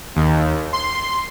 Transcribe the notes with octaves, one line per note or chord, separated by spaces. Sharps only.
D#2
C6